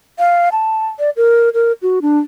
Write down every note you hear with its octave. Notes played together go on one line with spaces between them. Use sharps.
F5
A5
D5
A#4
A#4
F#4
D4